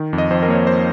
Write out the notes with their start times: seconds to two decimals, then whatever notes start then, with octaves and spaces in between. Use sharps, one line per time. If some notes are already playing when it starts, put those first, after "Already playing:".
Already playing: D#3
0.13 F2
0.18 D#5
0.31 F2 C5
0.43 A#4
0.48 A#3 C#5
0.55 C5
0.67 C5